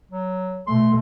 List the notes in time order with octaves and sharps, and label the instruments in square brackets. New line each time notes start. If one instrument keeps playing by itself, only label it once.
[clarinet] F#3
[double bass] B2 A3 [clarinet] C6